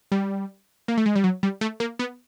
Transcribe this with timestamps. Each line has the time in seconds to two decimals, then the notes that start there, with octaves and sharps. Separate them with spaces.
0.12 G3
0.88 A#3
0.97 A3
1.06 G#3
1.16 G3
1.24 F#3
1.43 G3
1.61 A3
1.80 A#3
1.99 B3